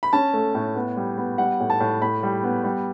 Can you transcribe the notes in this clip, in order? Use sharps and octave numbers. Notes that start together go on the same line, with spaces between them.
B5
C#4 A5
A3
A2
B3
G3
B3
G3 F#5
A2
A5
A2
A2 B5
G3
B3
G3